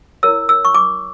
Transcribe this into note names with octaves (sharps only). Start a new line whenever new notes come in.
E4 A#4 C#5 E6
E6
C#6
D6